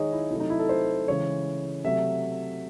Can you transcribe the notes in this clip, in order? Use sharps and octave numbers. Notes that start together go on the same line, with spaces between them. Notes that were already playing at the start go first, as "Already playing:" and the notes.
Already playing: D#3 G#3 D#4 G#4 C#5 D#5
E4
C3 F#3 A3 E4
D#4
E4
A4
C5
C#3 E3 G#3 C#5
C3 F#3 A3 E5